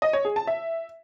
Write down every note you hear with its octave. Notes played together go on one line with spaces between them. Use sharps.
D#5
C#5
G#4
A5
E5